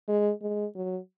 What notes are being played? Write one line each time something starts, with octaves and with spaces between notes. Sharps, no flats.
G#3
G#3
F#3